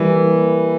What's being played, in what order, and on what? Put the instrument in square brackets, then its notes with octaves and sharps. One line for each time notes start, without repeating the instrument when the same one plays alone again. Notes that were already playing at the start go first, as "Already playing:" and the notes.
Already playing: [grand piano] E3 [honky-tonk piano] G3 A#3